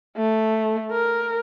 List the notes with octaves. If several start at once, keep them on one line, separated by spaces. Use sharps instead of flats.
A3
A#4